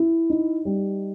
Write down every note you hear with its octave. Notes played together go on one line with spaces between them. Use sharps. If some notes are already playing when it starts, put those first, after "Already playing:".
Already playing: E4
D#4
G3